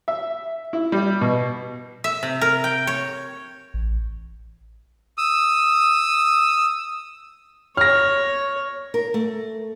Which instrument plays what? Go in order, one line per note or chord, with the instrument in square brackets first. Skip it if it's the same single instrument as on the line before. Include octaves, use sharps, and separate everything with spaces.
[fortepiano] E5
E4
G3
B2
[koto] E5
C3
A#4
G5
C#5
[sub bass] A1
[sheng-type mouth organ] D#6 E6
[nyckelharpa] C#5 [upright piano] F6 A#6
[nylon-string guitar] A#4
A3